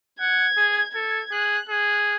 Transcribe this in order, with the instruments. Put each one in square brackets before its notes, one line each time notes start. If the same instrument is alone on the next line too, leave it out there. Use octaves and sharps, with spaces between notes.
[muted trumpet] F#5 [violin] G#6
[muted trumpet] G#4
[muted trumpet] A4 [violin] G#6
[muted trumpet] G#4 [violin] F#6
[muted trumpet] G#4 [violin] F#6